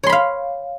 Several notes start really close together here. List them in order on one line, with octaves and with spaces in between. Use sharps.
C#5 C6 B5 F5